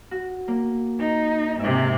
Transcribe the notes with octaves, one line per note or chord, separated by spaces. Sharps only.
F#4
A#3
D#4 A#4
G#2 C3 E5